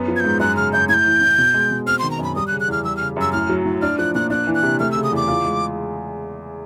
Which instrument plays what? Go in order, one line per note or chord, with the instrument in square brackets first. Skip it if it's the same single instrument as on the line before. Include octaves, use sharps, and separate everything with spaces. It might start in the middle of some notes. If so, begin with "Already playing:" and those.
Already playing: [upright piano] F#2 B3
F3
[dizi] G#6
[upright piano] G#2 [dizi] G6
[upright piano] F#2 [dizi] F#6
[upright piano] C#3 [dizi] F6
[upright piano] F#2 [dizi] G6
[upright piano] A2 [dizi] G#6
[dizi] G6
[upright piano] E3
A2
B2
G#3
B2
[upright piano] C4 [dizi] F6
[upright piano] D#3 [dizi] C6
[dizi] A#5
[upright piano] F#2 [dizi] B5
[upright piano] G3 [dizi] D#6
[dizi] F#6
[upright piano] C#3
[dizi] F#6
[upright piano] E2 [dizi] F6
[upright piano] G3 [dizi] E6
[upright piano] C#3 [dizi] F6
[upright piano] F#2 [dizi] E6
[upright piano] A2 [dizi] F6
[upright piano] F#3
A2
[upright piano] D4 [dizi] F6
[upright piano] F3 [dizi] F#6
[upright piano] A#2 [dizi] F#6
[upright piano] D4 [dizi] F#6
[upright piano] E3
[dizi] F#6
[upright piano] C3
[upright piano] A3 [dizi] F6
[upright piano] C#3 [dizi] E6
[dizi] D#6
[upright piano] E2 [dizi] D6
[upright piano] F4
G#3